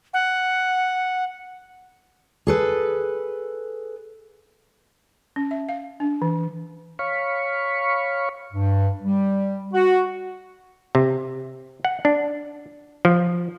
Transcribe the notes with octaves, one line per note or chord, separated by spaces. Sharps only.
F#5
G#4 A4 B4
C#4
E5
F5
D4
E3
C#5 F5 B5 C#6
G2
G3
F#4
C3
F#5
D4
F3